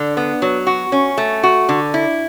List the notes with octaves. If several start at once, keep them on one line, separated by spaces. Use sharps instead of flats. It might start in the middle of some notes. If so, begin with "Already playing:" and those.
Already playing: D3
B3
F#3
F#4
C#4
A3
F#4
D3
E4